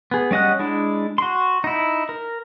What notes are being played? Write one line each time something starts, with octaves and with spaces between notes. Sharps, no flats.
B3 G#4
G3 C#4 D#5 F#5 F#6
G#3 D4 E4
F#4 C6
D#4 E4
A#4